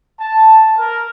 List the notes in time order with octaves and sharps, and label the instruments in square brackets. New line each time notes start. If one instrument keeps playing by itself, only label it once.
[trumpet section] A5
A#4